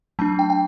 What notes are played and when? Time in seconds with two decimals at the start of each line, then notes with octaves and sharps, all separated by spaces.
0.19 F#3 A3 D4 A5
0.39 G5
0.50 G5